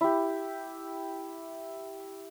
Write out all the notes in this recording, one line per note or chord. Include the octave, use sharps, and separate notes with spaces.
E4 G4